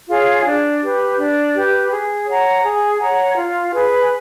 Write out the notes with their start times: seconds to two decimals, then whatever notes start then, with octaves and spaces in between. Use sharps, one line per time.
0.09 F4 G#4 C#5
0.46 D4
0.81 G4 B4
1.18 D4
1.55 G4 B4
1.91 G#4
2.27 C#5 F#5 A#5
2.63 G#4
3.00 C#5 F#5 A#5
3.35 F4
3.72 G#4 B4